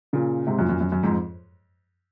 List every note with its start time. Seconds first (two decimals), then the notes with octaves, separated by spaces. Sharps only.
0.13 A#2 C#3
0.47 G#2 C3
0.59 F#2 A#2
0.69 F#2 A#2
0.81 F#2
0.92 F#2
1.03 F2 G#2